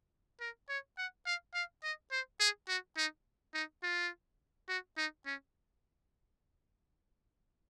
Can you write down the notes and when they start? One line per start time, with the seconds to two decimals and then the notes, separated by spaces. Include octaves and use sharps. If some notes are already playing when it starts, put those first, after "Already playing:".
0.40 A#4
0.69 C#5
0.97 F#5
1.26 F5
1.54 F5
1.83 D#5
2.11 C5
2.40 G#4
2.68 F#4
2.97 D#4
3.54 D#4
3.83 F4
4.69 F#4
4.97 D#4
5.26 C#4